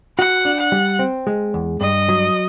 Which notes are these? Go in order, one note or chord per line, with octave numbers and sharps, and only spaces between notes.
F#4 F#5
D4
F#5
G3
C4
G#3
E2
G2 D#5
F#3